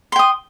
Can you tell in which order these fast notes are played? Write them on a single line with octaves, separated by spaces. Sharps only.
C6 G5 D#6